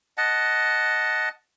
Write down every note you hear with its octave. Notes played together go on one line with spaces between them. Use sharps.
D#5 F#5 A5